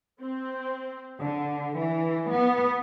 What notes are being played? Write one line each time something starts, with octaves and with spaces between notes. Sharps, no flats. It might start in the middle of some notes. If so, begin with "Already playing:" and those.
C4
D3
E3
B3